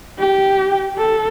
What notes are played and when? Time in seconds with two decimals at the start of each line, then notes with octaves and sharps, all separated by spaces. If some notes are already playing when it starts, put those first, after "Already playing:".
0.19 G4
0.98 A4